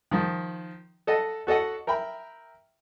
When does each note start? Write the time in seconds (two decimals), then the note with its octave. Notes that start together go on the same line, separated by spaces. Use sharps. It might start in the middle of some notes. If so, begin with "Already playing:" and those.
0.11 D#3 F3
1.07 A4 D#5 F#5 A5
1.47 F#4 A4 D#5 F#5
1.87 A#4 E5 G5 B5